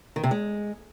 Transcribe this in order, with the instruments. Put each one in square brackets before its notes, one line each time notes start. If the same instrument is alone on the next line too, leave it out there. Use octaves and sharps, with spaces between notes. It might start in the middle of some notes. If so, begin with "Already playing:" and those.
[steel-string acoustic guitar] D#3
C3
G#3